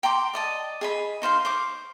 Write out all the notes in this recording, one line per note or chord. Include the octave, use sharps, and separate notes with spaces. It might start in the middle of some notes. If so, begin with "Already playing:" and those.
G5 A#5 C6 D6
D5 D#5 A5
G#4 D#5 B5
D#4 C5 F5 C6
C5 C#6 D6